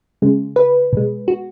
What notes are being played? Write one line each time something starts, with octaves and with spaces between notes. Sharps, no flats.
C#3 G#3
B4
B2 G#3
F#4